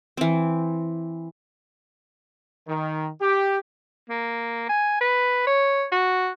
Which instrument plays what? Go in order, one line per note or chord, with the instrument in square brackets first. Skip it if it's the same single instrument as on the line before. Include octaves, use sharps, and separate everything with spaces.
[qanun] E3 C4
[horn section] D#3
G4
[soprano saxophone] A#3
G#5
B4
C#5
F#4